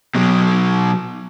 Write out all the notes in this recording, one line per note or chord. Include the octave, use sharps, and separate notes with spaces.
B2 F#3